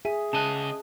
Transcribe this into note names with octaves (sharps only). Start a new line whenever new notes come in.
G#4 E5 G#5
C#3 D#5 A5 F#6